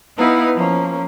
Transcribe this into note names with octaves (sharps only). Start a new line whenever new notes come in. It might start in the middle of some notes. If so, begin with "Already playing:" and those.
B3 D#4 E4 B4 F5
F3 A#3 C#4